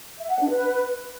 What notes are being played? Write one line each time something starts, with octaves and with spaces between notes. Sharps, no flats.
E5
F#5
D4
B4